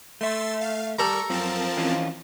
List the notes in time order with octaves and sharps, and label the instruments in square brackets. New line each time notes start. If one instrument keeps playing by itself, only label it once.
[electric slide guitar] A3 E5 [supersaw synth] C6 E6 A6
[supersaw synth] F5
[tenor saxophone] G3 [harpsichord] A4 A#5 [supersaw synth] A#4 C#6
[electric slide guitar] F#2 [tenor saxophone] F3 [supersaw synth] C4 A#4 A5
[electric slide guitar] E3 C#4 F4